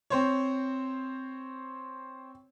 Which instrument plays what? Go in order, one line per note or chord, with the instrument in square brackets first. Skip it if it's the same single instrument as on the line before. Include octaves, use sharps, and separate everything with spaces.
[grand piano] C4 C5 C#5